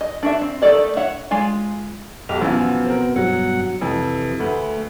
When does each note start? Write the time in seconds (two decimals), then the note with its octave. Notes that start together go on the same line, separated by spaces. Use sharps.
0.01 D#5
0.23 D4 F#4 E5
0.42 C4
0.62 D#3 A3 A4 D5 D#5
0.97 C#5 E5 F#5
1.31 G#3 F4 G#5
2.29 B1 G4 D#5 F6
2.41 F#2 B2 E3 F3 B3
2.86 C4 A#4
3.16 G2 B2 F#3 F#5
3.81 F2 C3 E3
4.40 D2 A3 B4